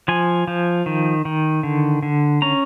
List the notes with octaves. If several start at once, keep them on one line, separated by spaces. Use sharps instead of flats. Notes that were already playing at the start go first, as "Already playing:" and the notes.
F3 G#5
F3
D#3
D#3
D3
D3
C#4 A#5